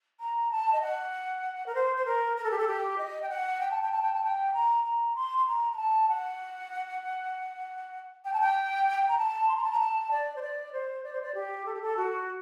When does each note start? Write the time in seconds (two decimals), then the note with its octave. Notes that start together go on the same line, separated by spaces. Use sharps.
0.19 A#5
0.50 A5
0.72 D#5
0.81 F#5
1.66 A#4
1.74 C5
1.96 C5
2.05 A#4
2.36 A#4
2.43 A4
2.50 G4
2.57 A4
2.67 G4
2.98 D#5
3.22 G5
3.28 F#5
3.60 G5
3.70 A5
3.81 G5
3.91 A5
4.02 G5
4.13 A5
4.23 G5
4.53 A#5
4.84 A#5
5.15 C6
5.37 C6
5.46 A#5
5.72 A#5
5.76 A5
6.08 F#5
8.24 G5
8.33 A5
8.40 G5
9.08 A#5
9.17 A5
9.48 C6
9.56 A#5
9.63 A5
9.71 A#5
9.79 A5
10.11 D5
10.35 C5
10.41 D5
10.72 C5
11.03 D5
11.12 C5
11.21 D5
11.34 G4
11.65 A4
11.73 G4
11.81 A4
11.96 F#4